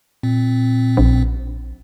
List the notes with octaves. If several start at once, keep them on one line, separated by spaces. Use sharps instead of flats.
A#2 C4
A#1